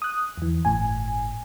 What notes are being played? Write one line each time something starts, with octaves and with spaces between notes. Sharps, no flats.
D#6 F#6
E2 E3
G1 A2 G#5